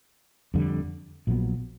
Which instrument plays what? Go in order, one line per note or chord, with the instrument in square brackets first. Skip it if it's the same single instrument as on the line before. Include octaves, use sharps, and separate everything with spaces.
[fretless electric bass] F2 D3 G3
A#1 A#2 F#3 B3